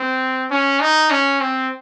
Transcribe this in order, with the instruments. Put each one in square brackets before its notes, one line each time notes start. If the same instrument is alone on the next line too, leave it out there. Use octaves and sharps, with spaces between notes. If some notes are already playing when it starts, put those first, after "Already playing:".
Already playing: [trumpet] C4
C#4
D#4
C#4
C4